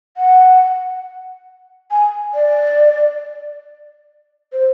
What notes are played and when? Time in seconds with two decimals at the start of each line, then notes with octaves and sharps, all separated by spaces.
0.17 F#5
1.91 G#5
2.34 D5
4.53 C5